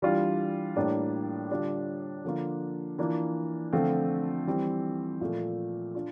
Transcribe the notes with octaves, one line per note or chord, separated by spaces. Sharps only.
E3 G3 D4 F4
A2 G3 A#3 D4
D3 G3 D4 F4
D3 F3 A#3 D4 F4
E3 A#3 D4 F4
D3 F3 A3 C4 F4
E3 G3 C4
A#2 F3 A3
D4 F4